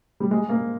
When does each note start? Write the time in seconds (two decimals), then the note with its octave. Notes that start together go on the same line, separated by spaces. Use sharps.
0.20 G3
0.31 G#3
0.49 A#3